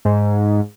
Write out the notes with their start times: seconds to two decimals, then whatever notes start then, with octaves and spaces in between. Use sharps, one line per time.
0.05 G#2